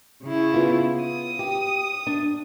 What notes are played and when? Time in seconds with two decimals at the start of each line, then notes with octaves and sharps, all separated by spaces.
0.23 C#3 E4
0.54 B3 F4
1.02 D#6
1.39 G4
2.07 D4